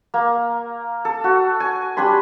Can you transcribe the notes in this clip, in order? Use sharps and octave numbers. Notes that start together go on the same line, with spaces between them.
A#3
A4
F#4
G#5
G3 D4 B5 C6